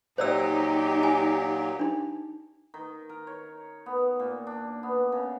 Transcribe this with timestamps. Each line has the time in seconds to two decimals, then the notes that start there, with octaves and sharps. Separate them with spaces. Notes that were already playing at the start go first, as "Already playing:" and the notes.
0.18 A#2 F#3 D#4 G4 C5 D5 E6
1.03 G#5
1.79 D4 D#4
2.74 D#3
3.09 A#4
3.27 C#5
3.86 B3
4.20 A#2
4.47 D4
4.83 B3
5.12 C#3